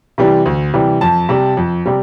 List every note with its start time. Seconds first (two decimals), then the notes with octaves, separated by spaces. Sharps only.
0.18 C3 E3 G3
0.45 D2
0.74 C3 E3 G3
1.01 F2 A5
1.29 C3 G3
1.57 F2
1.86 C3 G3